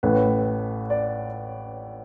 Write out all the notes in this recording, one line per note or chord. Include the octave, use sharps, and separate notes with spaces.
A1 A2 A3 B4
D5